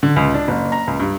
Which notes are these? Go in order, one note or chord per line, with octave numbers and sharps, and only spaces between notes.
D3
C#2
D4
F#1
A#5
C#2
G2